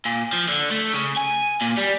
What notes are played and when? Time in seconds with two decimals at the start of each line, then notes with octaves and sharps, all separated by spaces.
0.06 A#2
0.33 F3
0.48 D3
0.71 A3
0.94 C#3
1.17 G#5
1.61 A#2
1.77 G3